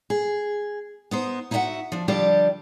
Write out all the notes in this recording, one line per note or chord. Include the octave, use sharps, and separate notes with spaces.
G#4
B3 D#4 C5
D#4 E4 F#4 D#5 E5 F#5
F3 D4
D3 F3 G3 D4 G4 D5